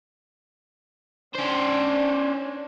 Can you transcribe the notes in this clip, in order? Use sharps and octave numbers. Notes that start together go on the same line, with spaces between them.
C#4 D4 C5